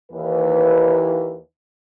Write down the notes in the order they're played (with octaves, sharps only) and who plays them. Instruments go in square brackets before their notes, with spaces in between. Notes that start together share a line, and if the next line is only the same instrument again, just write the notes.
[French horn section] D#2 E3 B4